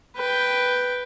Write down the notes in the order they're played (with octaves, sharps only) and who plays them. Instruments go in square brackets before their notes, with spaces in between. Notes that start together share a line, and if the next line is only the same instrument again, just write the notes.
[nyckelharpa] B4 G5